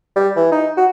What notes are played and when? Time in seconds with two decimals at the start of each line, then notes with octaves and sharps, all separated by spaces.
0.16 G3
0.36 E3
0.52 D#4
0.77 F#4